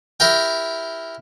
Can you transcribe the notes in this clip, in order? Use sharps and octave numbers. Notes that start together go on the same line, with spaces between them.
E4 G4 A#4 G5